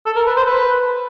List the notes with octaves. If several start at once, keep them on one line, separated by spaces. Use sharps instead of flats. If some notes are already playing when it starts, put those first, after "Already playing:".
A4
A#4
B4
C5
B4